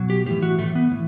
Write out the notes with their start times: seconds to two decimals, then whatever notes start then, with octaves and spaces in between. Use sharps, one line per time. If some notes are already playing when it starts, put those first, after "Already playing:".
Already playing: B2 F#3
0.10 G4
0.26 A2 E3 G4
0.42 F#4
0.59 A2 E3 A3
0.75 B3
0.92 A2 E3